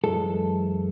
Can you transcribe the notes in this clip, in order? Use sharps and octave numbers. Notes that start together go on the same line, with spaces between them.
F#2 E3 G#3 A4